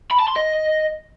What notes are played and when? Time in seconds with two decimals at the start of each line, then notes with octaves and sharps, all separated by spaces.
0.11 B5
0.20 A5
0.28 C6
0.36 D#5